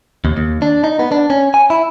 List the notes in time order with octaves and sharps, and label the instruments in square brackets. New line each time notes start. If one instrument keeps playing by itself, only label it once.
[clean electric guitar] D#2
D#2
D4
D#4
B3
D4
C#4
G#5
E4